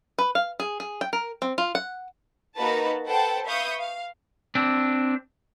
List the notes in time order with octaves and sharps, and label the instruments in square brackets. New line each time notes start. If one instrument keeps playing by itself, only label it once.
[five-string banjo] B4
F5
G#4
G#4
G5
A#4
C4
F4
F#5
[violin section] A#3 D#4 F#4 A#4 B4 A5
A4 B4 C5 F#5 G5 A5
B4 E5 F5 C#6 D#6 G6
F5
[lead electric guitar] C4 D4